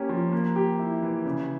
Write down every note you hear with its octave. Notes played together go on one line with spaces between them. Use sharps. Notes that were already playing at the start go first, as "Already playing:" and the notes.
Already playing: A#3 C#4 G4
F3
A#3
G4
E4
E3
C#3